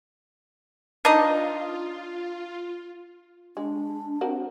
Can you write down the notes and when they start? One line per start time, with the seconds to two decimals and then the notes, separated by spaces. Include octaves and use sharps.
1.05 D4 D#4 F4 D#5
3.57 G#3 D4
4.21 C4 F#4 A#4